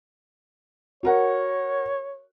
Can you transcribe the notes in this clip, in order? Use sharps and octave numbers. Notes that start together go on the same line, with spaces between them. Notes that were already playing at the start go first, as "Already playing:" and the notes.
F#4 A#4 C#5 F#5